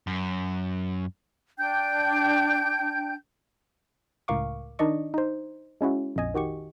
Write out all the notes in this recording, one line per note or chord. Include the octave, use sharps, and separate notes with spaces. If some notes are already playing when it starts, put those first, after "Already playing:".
F#2
D4 G5 G6
C#2 A2 A#4 F5 C#6 D6
D#3 D4 D#4 D5 D#5 C#6
D#4 C5
G#3 C#4 E4 F#4
A#1 F2 D#5 G#5
D#3 F#4 G4 C#6